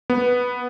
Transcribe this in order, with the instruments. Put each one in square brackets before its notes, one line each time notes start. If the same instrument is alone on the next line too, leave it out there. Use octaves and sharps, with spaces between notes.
[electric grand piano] B3